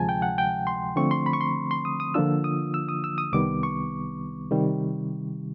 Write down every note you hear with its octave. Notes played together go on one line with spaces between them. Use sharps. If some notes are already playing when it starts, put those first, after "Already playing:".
Already playing: D2 C3 F3 G#3 G#5 A5
G5
F#5
G5
C6
D3 F3 A3 C4 C#6
C6
B5
C#6
C6
C6
D#6
D#6
D3 F3 A#3 D4 F4 E6
D#6
E6
D#6
E6
D#6
C2 C3 D#3 G3 B3 D6
C#6
C3 D#3 G3